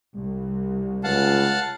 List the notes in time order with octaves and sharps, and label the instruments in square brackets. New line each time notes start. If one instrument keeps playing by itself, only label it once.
[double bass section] C2 [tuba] G3
[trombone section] C#2 [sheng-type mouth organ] F5 F#5 A5